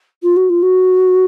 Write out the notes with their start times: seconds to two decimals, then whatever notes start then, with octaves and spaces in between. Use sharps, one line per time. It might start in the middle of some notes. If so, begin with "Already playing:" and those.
0.23 F4
0.36 F#4
0.49 F4
0.62 F#4